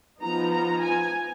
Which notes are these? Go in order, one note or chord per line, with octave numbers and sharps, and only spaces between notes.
F3 B3 D#4 A#5
A#5
G#5